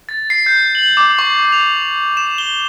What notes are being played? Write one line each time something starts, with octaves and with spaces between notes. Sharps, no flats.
A6
C7
G6
F#7
D6
C#6
F7
E7
G7